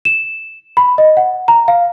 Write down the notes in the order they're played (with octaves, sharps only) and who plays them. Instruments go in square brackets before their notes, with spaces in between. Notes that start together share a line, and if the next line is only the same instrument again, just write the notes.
[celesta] E7
B5
D#5
F#5
A#5
F5